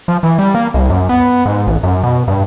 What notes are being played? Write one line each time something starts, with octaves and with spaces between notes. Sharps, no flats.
F3
E3
G3
A#3
C2
F#2
B3
G#2
A1
F#2
B2
G2